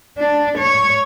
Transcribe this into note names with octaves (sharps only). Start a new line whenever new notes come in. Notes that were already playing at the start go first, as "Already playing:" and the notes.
D4
C#5